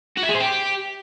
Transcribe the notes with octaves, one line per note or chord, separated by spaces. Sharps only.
F#4
E5
G#4
C5
G4